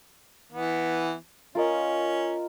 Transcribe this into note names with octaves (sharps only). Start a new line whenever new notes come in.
E3 B3
C#4 F4 A#4 D#5